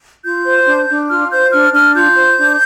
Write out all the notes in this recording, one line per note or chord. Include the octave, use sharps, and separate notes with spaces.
F4 G6
C5
D4
D4
F4 F6
C5 G6
D4 F6
D4 F6
F4 G6
C5
D4